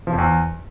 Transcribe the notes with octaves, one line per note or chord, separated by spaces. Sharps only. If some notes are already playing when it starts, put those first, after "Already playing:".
F3
F2
E2